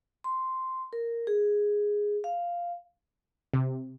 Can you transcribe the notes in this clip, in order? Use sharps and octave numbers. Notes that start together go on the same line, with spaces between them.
C6
A#4
G#4
F5
C3